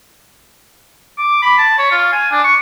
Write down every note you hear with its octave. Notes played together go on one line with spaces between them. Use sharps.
D6
B5
A5
C#5
F4
G#5
D4
C#6